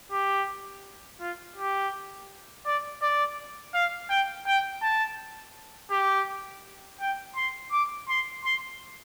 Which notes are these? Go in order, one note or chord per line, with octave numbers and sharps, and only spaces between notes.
G4
F4
G4
D5
D5
F5
G5
G5
A5
G4
G5
C6
D6
C6
C6